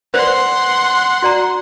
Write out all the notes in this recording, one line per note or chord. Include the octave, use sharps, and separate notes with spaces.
B4 C5 D5 F#5 C6
F#4 D5 A#5